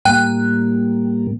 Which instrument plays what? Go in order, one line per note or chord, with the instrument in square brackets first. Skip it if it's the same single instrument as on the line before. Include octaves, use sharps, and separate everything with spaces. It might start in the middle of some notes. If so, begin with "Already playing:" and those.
[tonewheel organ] A2 G3 A#3 [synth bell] G5 F#6